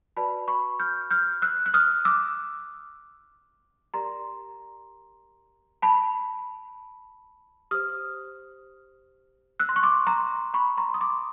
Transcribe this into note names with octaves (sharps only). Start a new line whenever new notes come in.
F#4 B4 D5 A5 B5
B5 C#6
F6 G6
F6 G6
E6 F#6
F#6
D#6 F6
D6 E6
G4 A#4 D5 A#5 C6
A5 B5
G4 C5 D#6 F6
E6 F#6
C6
C#6
C6 D6
A#5 C6
B5 C#6
A#5 C6
D#6
C6 D6